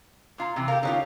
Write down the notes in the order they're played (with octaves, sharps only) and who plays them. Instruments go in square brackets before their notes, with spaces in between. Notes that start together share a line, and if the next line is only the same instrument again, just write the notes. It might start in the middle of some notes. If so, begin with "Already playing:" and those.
[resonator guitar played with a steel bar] A#2 F4 A#5
C3 E3
[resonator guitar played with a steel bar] G4 A4 A#4 [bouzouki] F5
[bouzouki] D3 C#4 F4 [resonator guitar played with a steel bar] D#4 G4